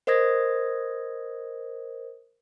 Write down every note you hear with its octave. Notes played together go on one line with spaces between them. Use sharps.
A#4 C5 D#5 D#6 G#6 A#6